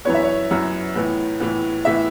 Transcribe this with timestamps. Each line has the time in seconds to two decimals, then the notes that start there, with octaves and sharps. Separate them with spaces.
0.05 F#2 E3 B3 C#5
0.14 E5
0.23 C#5
0.51 F#2 E3 B3
0.96 A2 E3 B3
1.40 A2 E3 B3
1.85 A2 E3 B3 E5